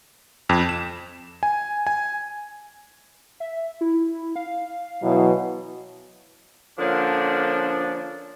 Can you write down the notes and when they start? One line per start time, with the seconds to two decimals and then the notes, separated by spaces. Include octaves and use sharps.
0.49 F2
0.69 E7
1.43 G#5
1.87 G#5
3.40 E5
3.81 E4
4.36 F5
5.03 B2 E3 F#3
6.80 D3 F3 A#3 C#4 D4